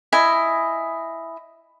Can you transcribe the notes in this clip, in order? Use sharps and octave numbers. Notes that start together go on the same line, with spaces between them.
E4 D#5 G#5